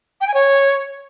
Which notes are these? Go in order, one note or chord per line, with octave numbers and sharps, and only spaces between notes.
G5
G#5
C#5